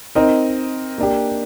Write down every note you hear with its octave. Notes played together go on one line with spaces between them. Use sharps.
C4 D#4 A#4 D#5
A#3 D4 G4